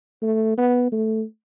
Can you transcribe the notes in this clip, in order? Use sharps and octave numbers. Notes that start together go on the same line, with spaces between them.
A3
B3
A3